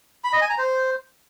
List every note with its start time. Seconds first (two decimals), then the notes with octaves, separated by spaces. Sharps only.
0.24 B5
0.33 D#5
0.41 G#5
0.50 A#5
0.58 C5